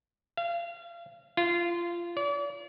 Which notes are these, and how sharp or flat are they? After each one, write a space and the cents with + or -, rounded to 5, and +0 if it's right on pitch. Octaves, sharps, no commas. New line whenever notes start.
F5 -30
F4 -20
D5 -40